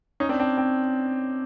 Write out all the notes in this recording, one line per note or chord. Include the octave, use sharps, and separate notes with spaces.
C#4 D#4
C4 D4
C4 D4
C4